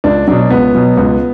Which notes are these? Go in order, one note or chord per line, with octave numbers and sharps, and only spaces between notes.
C#2 D4
B2 F#3 D4
C#2 B3
B2 F#3
C#2